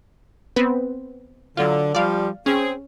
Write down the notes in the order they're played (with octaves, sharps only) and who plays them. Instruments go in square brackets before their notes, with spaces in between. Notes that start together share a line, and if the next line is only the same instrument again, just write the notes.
[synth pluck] B3 C4 B4
[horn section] D3 [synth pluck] F#3 F4
[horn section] F3 G3 [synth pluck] D5 F5
[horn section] C4 G#4 [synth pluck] C#4